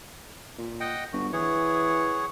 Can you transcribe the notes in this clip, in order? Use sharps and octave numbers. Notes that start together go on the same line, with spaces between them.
A#2
D#5 F#5 G5
G1 F#4
E3 G#4 C#5 F#5